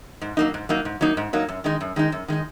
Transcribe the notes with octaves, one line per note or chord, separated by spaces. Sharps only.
G#2
F#3 A#3 D#4
G#2
F#3 A#3 D#4
G#2
F#3 A#3 D#4
G#2
F#3 A#3 D#4
F#2
D#3 G#3 D#4
F#2
D#3 G#3 D#4
F#2
D#3 G#3 D#4